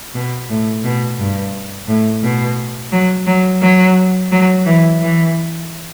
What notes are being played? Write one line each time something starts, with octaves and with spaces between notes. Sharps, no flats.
B2
A2
B2
G2
A2
B2
F#3
F#3
F#3
F#3
E3
E3